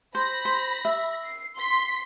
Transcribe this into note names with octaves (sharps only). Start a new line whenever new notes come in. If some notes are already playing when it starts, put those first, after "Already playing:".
C5 B5 A#6
C5
E5
C7
C6 B6